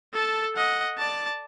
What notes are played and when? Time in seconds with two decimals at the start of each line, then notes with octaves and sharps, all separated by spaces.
0.13 A4 A5
0.56 D#5 F#5
0.98 D5 A5